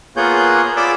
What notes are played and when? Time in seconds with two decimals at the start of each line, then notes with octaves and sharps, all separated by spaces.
0.17 A#3 B3 F4 G#4 C#5 G6
0.76 F4 G#4 D5 B5 D6 E6